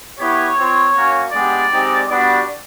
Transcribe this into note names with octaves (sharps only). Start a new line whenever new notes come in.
B3 E4 G4 C#5
C4 F4
A#3 C#4 F#4
G#3 B3 D4 G4 D5
G#3 C4 D#4 G4
G3 B3 D4 F#4 D5